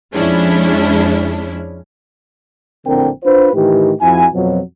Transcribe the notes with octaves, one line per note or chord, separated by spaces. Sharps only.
F2 F3 G#3 C#4 D4 E4
A#1 A2 D3 C4 A#4 G5
D4 F4 B4 C5
A2 D#3 E3 G4
F2 F3 E4 F#4 G#5
F2 B2 F3 F#3